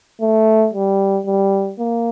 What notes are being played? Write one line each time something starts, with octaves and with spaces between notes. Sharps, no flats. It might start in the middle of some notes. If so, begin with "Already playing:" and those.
A3
G3
G3
A#3